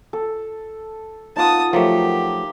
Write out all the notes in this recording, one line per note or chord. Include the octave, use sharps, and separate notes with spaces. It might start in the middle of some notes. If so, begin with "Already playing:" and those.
A4
D#4 F4 F#5 A5 D#6
F3 F#3 A3 G4 A#4